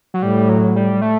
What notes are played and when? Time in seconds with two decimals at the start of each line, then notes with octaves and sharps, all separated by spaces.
0.14 F#3
0.23 A2 G3
0.49 F#3
0.76 G3
1.02 A3